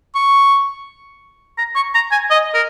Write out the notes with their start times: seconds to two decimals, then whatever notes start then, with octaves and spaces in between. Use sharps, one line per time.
0.15 C#6
1.58 A#5
1.75 C#6
1.95 A#5
2.11 G#5
2.30 D#5
2.54 A#4